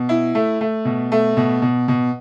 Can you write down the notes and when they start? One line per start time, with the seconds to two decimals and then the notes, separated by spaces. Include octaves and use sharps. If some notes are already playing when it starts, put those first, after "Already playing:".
Already playing: B2
0.09 E4
0.35 A3
0.61 A3
0.85 B2
1.12 A3
1.37 B2
1.62 B2
1.88 B2